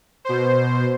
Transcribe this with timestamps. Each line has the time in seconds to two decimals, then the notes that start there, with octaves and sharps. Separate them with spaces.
0.25 B2 C5